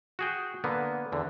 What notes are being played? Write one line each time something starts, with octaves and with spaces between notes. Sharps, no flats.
F#4 G#4 G5
D3 A#3 B3
E2 D3